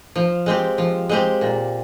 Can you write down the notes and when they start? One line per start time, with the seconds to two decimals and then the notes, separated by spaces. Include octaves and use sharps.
0.16 F3
0.46 G#3 C4 G4
0.78 F3
1.09 G#3 C4 G4
1.41 A#2